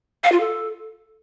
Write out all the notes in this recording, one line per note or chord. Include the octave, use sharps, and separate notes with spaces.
F5
F4
A4